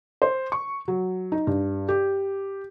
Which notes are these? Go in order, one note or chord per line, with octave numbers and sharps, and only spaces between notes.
C5
C#6
F#3
D#4
G2
G4